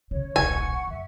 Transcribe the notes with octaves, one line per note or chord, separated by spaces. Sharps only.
E2 C#3 C#5
D#1 B1 F#5 G#5 C#6
F#2 E5